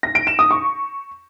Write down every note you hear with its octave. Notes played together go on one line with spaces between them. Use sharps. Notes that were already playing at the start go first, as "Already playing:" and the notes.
A#6
D7
E7
D#6
C#6